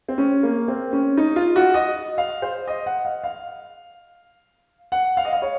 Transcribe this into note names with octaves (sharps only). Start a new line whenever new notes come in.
C4
C#4
A#3
C4
C#4
D#4
F4
F#4
D#5
F5
C5
D#5
F#5
F5
F5
F#5
F5
D#5
F5
C#5